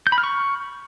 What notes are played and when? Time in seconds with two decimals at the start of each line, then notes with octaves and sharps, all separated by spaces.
0.07 G6
0.12 B5
0.18 F6
0.24 C#6